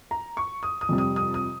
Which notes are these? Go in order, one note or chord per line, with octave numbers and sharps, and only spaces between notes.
A#5
C#6
D#6
D#6
F2 C3 G3
D#6
D#6
D#6